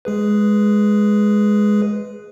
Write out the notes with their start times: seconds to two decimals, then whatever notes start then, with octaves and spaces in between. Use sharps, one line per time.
0.05 G#3 G#4 B4